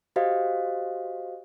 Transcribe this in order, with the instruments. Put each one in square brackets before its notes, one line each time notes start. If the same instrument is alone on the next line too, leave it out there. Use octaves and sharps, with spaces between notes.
[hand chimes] F#4 G4 C5 D#5 F5